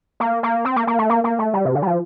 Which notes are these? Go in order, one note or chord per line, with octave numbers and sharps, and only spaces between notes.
A#3
A#3
C4
A#3
A#3
A3
A#3
A#3
A3
G3
C3
D3
G3
F3